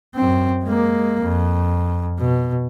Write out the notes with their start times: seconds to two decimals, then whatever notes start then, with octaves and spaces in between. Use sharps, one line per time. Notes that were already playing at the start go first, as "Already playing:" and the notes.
0.15 F#2 C4
0.64 G#3 A#3
1.21 F2
2.20 B2